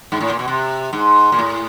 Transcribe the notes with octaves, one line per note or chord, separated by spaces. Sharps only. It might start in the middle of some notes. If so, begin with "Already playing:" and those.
G#2
A2
A#2
B2
C3
G#2
A#2
A2